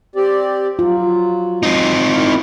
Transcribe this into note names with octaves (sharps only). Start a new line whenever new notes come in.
C4 G4 D5
F#3 F4
C4 D#4
D#3 E4 F5